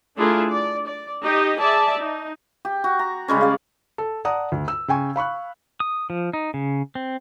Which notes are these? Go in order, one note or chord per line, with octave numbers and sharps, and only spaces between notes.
A3 D4 E4 F4 G#4 A#4
D5
D5
D#4 G4 D#5
G#4 D5 E5 A5
D#4
G4
F#4
A#5
C#3 G3 G#3 C#4
D5 F5
A4
D5 F#5 A5 A#5 D#6
D2
E6
C#3 G5 G#5 C#6
F5 B5 C#6 F#6
D#6
F3
D#4
C#3
C4